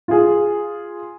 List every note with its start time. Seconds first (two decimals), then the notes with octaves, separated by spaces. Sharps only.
0.08 F4 G#4